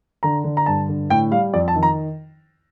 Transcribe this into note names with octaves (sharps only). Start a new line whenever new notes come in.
D3 A#5
D3
A#5
G2 A5
D3
A2 G5
G3 F5
F2 D5
A5
D#3
A#5